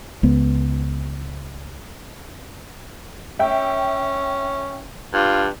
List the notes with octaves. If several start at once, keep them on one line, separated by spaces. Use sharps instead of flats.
C#2 B3
C#4 E5 G5
G2 F4